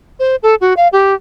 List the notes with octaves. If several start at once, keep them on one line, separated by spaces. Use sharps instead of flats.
C5
A4
F#4
F5
G4